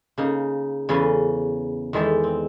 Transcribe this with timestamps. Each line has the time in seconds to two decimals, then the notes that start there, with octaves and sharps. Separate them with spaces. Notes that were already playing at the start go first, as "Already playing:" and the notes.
0.18 C#3 A#3 D#4
0.89 E2 C#3 C#4 A4 B4 G#5
1.93 E2 D#3 G#3 A4 E5 G5
2.24 C4